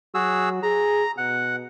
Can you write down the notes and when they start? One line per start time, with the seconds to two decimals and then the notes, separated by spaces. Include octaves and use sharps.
0.15 F#3 F#4 G#4 E6
0.63 G#4 A#5
1.18 B2 F#5